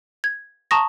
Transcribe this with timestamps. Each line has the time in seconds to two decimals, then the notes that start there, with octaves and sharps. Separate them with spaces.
0.24 G#6
0.71 A5 A#5 C#6 D#6 A#6